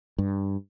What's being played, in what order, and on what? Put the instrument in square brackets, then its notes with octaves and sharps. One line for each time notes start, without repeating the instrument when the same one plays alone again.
[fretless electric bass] G2